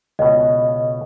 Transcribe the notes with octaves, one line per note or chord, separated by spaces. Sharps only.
C#2 B2 D#5